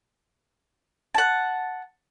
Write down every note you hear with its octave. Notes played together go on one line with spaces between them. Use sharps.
F#5 A5